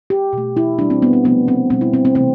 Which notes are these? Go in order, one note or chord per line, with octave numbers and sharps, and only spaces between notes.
G4
B2 A3
E4
B2 G3 D4
C4
B3
C4
C3 F3 A3 B3
C4
B2 G3 C4
E4
C4
C4
C3 E3 A3 C4